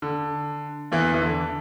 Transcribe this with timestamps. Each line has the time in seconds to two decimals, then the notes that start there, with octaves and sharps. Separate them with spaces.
0.02 D3
0.92 E2 E3
1.14 E3
1.22 D3